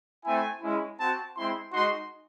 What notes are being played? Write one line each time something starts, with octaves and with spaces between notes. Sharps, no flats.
A3 C4 E4 G#5
G#3 C#4 E4
C4 F#4 A5
G#3 C4 E4 C6
G#3 D#4 F#4 C6